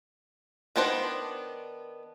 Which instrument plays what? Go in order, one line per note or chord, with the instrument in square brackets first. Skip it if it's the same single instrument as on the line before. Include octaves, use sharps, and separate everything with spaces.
[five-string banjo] D#3 B3 D4 C5